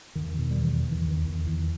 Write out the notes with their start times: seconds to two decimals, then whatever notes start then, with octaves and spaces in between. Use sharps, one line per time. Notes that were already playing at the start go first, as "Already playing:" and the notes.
0.15 E2 D#3
0.37 B2 D#3
0.51 G3
0.59 E2 E3
0.81 E2
0.92 D#3
1.00 E3
1.03 E2
1.08 D#3
1.24 E2 D#3
1.46 E2 E3